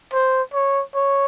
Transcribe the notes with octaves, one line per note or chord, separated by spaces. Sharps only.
C5
C#5
C#5